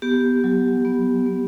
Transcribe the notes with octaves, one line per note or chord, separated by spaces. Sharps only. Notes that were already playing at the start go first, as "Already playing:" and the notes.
B3 G4
F#3
B3
B3